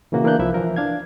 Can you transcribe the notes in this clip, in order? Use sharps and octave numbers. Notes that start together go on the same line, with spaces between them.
A#2 C#3 E3 A#3 F#4
E3 A#3 B3 D4 F#6 G6
C2 F3 E4 E5
E3 F3 A#4
D4 F5 G#6